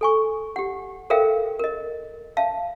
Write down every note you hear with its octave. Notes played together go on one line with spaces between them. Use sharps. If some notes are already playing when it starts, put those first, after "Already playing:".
A4 G#5 C#6
G4 F#5
A4 A#4 C5 E5 F5 G5
A#4 D#5
E5 F5 A5